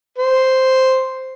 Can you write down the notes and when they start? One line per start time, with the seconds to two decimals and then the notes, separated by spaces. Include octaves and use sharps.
0.18 C5